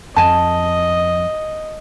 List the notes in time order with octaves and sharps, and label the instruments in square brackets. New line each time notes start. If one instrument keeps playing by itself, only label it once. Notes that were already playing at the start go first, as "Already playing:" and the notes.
[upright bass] F2 [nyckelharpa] D#5 [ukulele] G#5 A5